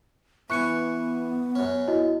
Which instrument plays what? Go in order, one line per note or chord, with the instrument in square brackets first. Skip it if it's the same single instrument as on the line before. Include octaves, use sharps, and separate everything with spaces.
[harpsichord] E3 G#5 [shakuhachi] B3 [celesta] C#6 F#6 C#7
[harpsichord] F#2 C#4
[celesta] E4 F#4 D#5